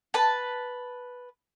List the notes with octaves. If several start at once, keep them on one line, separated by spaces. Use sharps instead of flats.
B4 A5